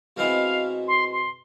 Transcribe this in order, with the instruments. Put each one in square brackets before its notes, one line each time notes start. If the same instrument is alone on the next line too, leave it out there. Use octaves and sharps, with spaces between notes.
[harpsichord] B2 G#3 C4 E4 G#4 [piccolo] F5
[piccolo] C6
C6